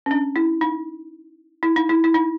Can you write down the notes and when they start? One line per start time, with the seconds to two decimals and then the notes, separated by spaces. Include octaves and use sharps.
0.06 C#4
0.11 D4
0.36 E4
0.61 D#4
1.63 E4
1.76 D#4
1.89 E4
2.04 E4
2.14 D#4